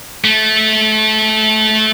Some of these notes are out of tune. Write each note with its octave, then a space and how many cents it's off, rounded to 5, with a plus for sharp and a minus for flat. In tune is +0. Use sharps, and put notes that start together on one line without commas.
A3 -20